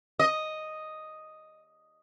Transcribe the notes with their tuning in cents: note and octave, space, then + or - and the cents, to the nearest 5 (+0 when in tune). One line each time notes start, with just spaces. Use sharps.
D#5 +0